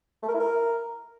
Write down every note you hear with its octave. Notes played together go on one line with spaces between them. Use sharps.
A3
A#4
E4
A#4